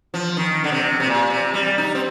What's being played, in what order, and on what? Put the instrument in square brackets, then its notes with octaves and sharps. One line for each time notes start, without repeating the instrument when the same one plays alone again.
[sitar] F3
D#3
D3
C3
C3
A#2
C3
G3
D#4
C4